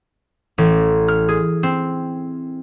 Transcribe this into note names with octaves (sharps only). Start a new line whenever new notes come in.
A1
F6
G#4
C4